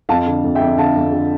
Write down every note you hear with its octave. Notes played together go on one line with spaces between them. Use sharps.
F2 F5 A5
D3
F2
E5 G5
F2
D3 F5 A5
F2
D3